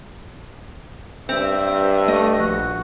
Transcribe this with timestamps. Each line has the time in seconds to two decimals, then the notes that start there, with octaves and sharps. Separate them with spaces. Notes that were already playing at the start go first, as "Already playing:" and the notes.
1.29 G2 C4 E5
2.08 A3 D#5
2.38 A#1 F#4